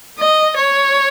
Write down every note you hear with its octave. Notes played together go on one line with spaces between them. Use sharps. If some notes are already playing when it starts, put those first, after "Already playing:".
D#5
C#5